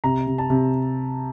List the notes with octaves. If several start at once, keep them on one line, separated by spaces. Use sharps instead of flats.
C3 A#5
C3
A5
C3